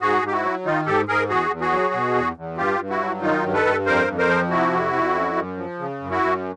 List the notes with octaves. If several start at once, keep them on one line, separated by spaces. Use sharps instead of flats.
G#2 F#4 G#4
G#2 G4
E4 F#4
F#3
D#3 D#4 F4
G#2 G4 A4
G#2 G#4 A#4
E2 F#4 G#4
E2
F#4 G#4
F#3
B2
E2
E2
G2 F4 G4
G2
E4 F#4
F#3
D#3 D#4 F4
G2
A4 B4
G2
F2 A#4 C5
F2
A#4 C5
F3
C3 E4 F#4
F2
F2
F#2
F#2
F3
C#3
F#2
E4 F#4
F#2